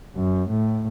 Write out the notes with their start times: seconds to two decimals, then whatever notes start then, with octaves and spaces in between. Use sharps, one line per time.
0.15 F#2
0.49 A2